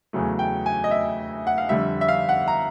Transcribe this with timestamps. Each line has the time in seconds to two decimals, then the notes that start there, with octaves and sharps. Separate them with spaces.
0.13 E2 C#3 F#3 A3
0.39 G5
0.66 G#5
0.84 D#5
0.91 E5
1.47 F#5
1.58 F5
1.69 F2 D3 G3 E5
2.01 E5
2.08 F5
2.29 F#5
2.48 A#5